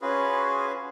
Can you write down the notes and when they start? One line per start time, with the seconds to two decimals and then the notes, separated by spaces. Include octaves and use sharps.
0.02 C#4 F4 F#4 G#4 B4